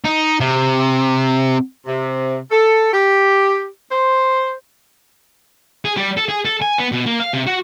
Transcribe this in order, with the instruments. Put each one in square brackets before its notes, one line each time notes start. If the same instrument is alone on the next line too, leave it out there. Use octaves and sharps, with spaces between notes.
[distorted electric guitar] D#4
C3
[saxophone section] C3
A4
G4
C5
[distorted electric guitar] G#4
G3
A4
G#4
A4
G#5
B3
B2
A#3
F5
C3
F#4